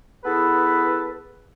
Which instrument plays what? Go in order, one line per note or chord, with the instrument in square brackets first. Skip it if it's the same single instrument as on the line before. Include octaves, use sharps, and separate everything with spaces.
[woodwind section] B3 E4 G#4 A4 B4